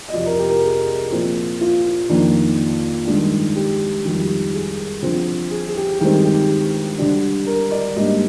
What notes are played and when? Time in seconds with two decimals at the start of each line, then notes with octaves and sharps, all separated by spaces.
0.08 D#5
0.13 F2 C3 F3 D5
0.26 A#4
0.39 G4
0.50 A#4
0.63 G#4
1.12 A#2 F3 C4
1.61 F4
2.09 F2 D#3 A#3 D4
3.07 G2 D#3 G#3 D4
3.56 G4
4.05 F2 D#3 G3
4.54 G#4
5.03 D3 F3 C4
5.51 G#4
5.68 G#4
5.76 G4
6.00 G2 D#3 G#3 C4 G4
6.25 G4
6.98 D3 G3 D4
7.46 A#4
7.71 D5
7.96 G#2 G3 A#3 D4 D#5